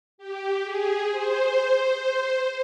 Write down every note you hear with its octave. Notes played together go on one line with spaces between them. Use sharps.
G4
G#4
C5